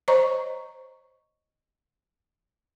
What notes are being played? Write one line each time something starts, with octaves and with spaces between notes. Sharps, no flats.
C5 C#5 D#5 A#5 C#6